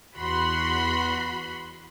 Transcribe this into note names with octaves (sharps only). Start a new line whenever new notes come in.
E2 F#4 B5 C6